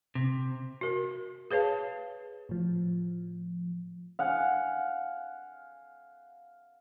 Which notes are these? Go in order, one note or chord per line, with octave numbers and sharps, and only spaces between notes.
C3
F#4 A#4
G#4 B4 C#5 F5 A5
A2 F3
F5 F#5 G#5